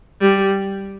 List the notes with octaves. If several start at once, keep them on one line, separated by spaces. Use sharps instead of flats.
G3